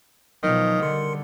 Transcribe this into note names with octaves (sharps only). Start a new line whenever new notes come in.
B2 D#3 F3 F#3 D#4 D#6
D3 G3 A#4 C6 C#7